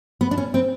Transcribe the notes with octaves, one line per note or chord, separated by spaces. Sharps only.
B3
D4
C#4
C4